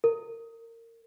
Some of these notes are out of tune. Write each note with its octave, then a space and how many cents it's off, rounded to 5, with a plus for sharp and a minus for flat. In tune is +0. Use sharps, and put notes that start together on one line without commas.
A#4 -25